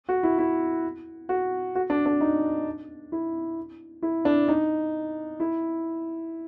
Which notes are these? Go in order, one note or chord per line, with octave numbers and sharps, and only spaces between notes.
F#4
E4
E4
F#4
F#4
D4
D4
D#4
E4
E4
D4
D#4
E4